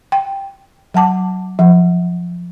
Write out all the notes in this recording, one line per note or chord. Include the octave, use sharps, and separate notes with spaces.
G5
F#3 F#5 A5 D6
F3 F#5